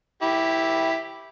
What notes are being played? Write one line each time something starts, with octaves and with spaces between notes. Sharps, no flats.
E4 G4